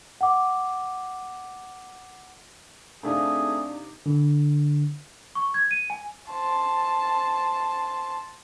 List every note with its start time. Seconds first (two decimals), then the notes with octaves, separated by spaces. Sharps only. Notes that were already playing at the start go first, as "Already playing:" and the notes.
0.21 F#5 D6
3.03 C3 A3 C4 D4 D#4 G#4 F5
4.06 D3
5.35 C#6
5.54 G#6
5.71 D#7
5.90 G#5
6.31 C5 A5